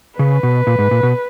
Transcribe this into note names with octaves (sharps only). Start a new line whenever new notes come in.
C#3 B4
B2
A#2
G#2
A#2
B2